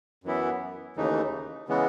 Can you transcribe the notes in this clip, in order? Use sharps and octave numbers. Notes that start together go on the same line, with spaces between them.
F#2 E3 B3 E4
D#2 C#3 E3 A3 D#4
C#3 E3 G#3 B3